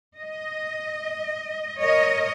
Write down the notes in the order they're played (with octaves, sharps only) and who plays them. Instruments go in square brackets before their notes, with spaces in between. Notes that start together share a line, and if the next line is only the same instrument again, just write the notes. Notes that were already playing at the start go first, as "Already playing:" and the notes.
[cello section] D#5
A#4 C#5 D#5